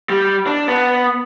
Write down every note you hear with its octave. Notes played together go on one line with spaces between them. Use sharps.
G3
D4
B3